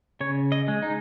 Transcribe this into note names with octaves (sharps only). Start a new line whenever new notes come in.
C#3 C#5
D#5
G#3
D#4